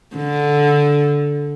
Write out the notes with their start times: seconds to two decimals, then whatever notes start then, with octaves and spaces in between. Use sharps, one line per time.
0.16 D3